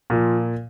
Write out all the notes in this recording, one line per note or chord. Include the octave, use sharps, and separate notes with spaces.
A#2 F3